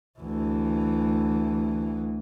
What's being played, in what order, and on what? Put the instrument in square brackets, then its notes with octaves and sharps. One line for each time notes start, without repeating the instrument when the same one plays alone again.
[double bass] D2 E3